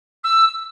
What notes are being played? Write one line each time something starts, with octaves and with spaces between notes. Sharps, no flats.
E6